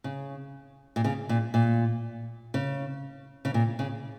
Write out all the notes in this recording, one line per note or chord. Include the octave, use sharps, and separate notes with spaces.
C#3
A#2
C#3
A#2
A#2
C#3
C#3
A#2
C#3